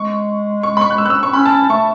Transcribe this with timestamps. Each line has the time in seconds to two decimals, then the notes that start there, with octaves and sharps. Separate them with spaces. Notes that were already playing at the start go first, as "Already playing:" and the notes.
Already playing: G#3 C#6
0.63 C#6
0.77 B5
0.81 C#6
0.90 F#6
0.98 E6
1.06 F#6
1.10 E6
1.23 C#6
1.33 C#4 B5
1.46 A5
1.70 A3 C#6